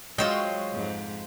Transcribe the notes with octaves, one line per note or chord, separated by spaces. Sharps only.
F#3 G#3 F4 C5 D#5 G5
F2 G#2